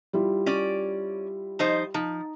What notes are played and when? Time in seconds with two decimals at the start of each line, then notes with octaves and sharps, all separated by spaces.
0.13 G3 E4 F4
0.46 C#4 D5
1.59 F3 D#4 C5
1.94 F3 D#4